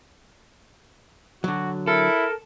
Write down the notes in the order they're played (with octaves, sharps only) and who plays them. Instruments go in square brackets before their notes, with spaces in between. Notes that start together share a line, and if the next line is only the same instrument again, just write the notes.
[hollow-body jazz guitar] D3 F#3 [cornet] F#4
[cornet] E4 [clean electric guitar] A4 [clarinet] A#4